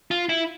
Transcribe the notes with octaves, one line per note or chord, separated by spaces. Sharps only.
F4
E4